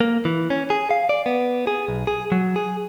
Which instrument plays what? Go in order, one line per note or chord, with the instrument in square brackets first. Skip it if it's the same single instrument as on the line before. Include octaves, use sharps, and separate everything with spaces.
[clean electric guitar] A#3
E3
C#4
G#4
F5
D5
B3
G#4
B1
G#4
F#3
G#4